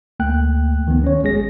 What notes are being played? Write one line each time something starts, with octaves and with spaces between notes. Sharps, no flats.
D2 A3 A#3 G5 F#6
D2 D#3 F3 B3
C#4 C#5
G#1 G#3 G#4 A#6